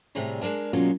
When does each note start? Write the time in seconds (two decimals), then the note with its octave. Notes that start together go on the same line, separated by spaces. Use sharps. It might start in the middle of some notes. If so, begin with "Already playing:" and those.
0.15 A2 C3 G3 G#4 C#5 A#5
0.41 G#3 D4 A#4 A5
0.73 B2 F#3 G#3 A#3 C#4 F4